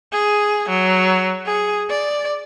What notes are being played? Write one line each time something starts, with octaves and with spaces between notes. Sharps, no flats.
G#4
F#3
G#4
D5